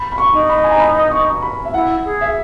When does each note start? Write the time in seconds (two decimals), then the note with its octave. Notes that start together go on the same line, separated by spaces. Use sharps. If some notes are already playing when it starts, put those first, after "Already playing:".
Already playing: B5
0.12 B5
0.18 C#6
0.33 D#4
0.49 B5
0.64 G#5
0.72 A#5
0.80 B5
1.11 C#6
1.42 B5
1.65 E5
1.74 E4 F#5
2.05 G#4
2.21 E5